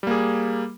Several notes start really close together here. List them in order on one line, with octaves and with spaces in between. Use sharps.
G3 A#3 G#4